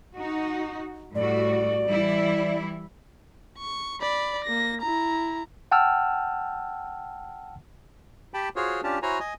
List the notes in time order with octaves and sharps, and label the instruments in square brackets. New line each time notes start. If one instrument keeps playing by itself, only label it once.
[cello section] D#4 F#4
[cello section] A2 G3 F#4 [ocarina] D5
[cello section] E3 G3 E4
[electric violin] C#6
D5 B5
A#3 A#6
E4 A#5
[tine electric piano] F#5 G5 A5 E6 F6
[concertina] G4 G5 A5 B5
F4 F#4 G#4 C5 C#5
C#4 D4 F4 G4 A5
E4 F#4 C5 C#5 G#5 A#5
D#5 G#5 D#6